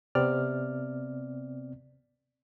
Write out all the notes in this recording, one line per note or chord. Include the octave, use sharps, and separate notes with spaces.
C3 B3 C4 D5 F6